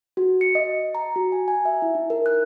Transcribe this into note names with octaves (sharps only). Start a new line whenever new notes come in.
F#4
C#7
D#5
A#5
F#4
G#5
G#5
E5
E4
D#4
A#4
F#6